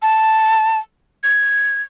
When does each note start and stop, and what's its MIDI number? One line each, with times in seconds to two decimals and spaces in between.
0.02 0.77 81
1.23 1.82 92